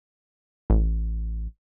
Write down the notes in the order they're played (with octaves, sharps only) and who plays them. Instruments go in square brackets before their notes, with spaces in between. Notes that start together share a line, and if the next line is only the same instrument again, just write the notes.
[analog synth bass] A1